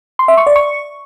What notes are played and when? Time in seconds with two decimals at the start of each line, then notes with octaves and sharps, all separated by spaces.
0.19 C6
0.28 E5
0.37 C#6
0.47 D5
0.56 C#6